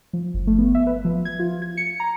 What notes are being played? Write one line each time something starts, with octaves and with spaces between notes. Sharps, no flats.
F3
G1
A3
B3
E5
B4
F3
G#6
F4
G#6
C#7
A#5